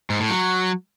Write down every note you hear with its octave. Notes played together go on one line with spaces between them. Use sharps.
G#2
A2
F#3